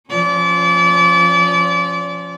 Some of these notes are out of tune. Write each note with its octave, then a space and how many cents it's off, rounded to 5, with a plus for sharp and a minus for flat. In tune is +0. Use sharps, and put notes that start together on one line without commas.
F3 +0 C#4 +0 D5 -35